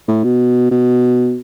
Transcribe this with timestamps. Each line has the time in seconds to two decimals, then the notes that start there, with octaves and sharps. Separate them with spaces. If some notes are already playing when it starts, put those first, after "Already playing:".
0.08 A2
0.24 B2
0.71 B2